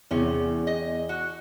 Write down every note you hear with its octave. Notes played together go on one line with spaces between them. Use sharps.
E2 C3 C#4
D#5
F#4